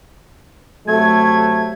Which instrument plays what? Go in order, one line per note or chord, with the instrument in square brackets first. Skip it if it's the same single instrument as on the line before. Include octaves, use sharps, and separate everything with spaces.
[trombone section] C3 F#3 A3 [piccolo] G#6